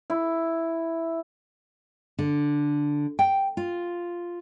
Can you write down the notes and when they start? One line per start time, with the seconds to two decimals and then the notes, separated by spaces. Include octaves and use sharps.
0.10 E4
2.19 D3
3.19 G5
3.57 F4